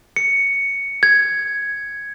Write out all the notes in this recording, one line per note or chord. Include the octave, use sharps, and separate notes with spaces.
C#7
G#6